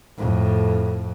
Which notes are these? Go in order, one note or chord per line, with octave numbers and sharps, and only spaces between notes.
F2 A2